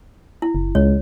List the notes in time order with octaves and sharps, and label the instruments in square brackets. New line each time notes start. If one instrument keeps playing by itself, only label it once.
[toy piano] E4
[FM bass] F#1
[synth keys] C#2 [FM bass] G#3 [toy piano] C#5